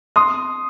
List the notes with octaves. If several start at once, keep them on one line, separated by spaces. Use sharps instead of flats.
C6 D#6